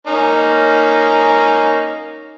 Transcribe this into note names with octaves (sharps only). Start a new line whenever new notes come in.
A#3 C#4 D#4